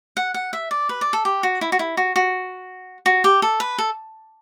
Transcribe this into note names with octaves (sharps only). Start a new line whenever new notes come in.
F#5
F#5
E5
D5
B4
D5
A4
G4
F#4
E4
F#4
E4
F#4
F#4
F#4
G4
A4
B4
A4